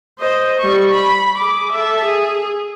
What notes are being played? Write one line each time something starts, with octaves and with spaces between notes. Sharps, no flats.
C5 D#5
G3 C#6
B5
G#4 D6
A4 E5
G#4